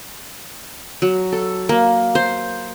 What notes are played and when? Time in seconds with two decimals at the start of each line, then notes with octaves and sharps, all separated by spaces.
1.02 F#3
1.32 A4
1.69 A#3
2.15 C5